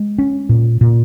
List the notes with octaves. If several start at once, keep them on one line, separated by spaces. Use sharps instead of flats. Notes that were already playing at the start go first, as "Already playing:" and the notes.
Already playing: G#3
C#4
A#2
A#2